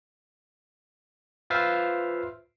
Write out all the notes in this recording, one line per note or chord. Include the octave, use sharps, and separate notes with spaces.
F4 B4 C5 E5 F5